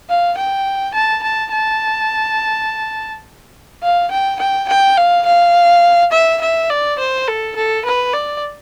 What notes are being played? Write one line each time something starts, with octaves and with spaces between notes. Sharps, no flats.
F5
G5
A5
A5
A5
F5
G5
G5
G5
F5
F5
E5
E5
D5
C5
A4
A4
B4
D5